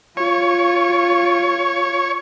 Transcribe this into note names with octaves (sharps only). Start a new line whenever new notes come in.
F4 C#5